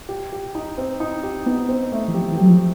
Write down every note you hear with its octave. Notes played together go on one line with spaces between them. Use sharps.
G4
G4
D#4
C4
D#4
G4
B3 D#4
C4
A3
E3
F3 G4
E3
F#3 G4
F3